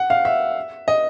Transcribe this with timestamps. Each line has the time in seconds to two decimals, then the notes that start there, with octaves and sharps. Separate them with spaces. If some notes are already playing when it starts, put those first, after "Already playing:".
Already playing: F#5
0.10 F5
0.25 E5
0.88 D#5